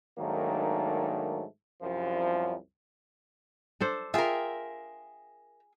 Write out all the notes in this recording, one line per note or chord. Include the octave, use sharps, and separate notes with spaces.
G#2 D#3 F#3 A3 A#3 D4
C2 F#2 F3
D4 A4 C5
F4 G#4 A#4 E5 G5